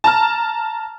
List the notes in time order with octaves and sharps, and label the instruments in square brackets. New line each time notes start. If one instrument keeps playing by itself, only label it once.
[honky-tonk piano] A5 A#5 F6